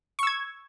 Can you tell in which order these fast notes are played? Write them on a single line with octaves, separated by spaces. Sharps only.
C#6 E6 G#6